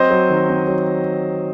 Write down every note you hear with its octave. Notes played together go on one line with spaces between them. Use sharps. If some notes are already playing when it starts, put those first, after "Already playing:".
Already playing: F#3 C4 C5 D#5
F#3
D#3
C4
F#3